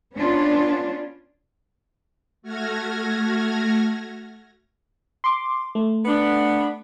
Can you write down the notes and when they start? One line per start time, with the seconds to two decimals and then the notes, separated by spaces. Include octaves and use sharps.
0.15 B3 C#4 D4 F4
2.42 A3 F#4 F6 G#6 A#6
5.24 C6 D6
5.75 A3
6.05 B3 D4